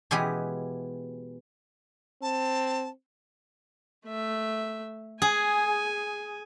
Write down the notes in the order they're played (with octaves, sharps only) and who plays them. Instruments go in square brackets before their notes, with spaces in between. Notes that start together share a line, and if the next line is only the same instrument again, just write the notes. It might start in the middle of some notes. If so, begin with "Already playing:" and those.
[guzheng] B2 E3 G#3 B3 G4 G#4
[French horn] C4 [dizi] A5
[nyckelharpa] A3 E5
[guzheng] G#4 [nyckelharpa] G#5